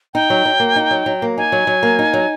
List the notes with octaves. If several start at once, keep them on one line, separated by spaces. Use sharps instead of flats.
D#4 G5
F#3
F#3
A#3
D#4
F#3
F#3
A#3
D#4 G#5
F#3
F#3
A#3
D#4
F#3